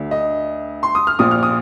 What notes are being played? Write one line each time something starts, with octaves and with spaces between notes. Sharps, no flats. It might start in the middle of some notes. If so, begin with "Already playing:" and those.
Already playing: D2 D3
D#5
C6
D#6
F6
A#1 A#2 D#6
F6
D#6